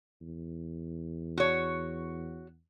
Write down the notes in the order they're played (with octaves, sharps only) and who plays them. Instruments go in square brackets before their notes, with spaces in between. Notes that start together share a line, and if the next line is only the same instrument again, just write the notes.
[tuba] E2
[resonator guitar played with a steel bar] F#4 C#5